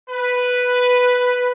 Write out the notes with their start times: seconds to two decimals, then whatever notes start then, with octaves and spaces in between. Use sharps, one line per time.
0.10 B4